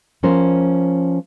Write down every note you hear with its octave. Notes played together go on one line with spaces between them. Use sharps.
F3 C#4 A#4 C5